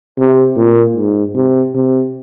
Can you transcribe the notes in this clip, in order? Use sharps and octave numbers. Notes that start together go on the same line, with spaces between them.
C3
A#2
G#2
C3
C3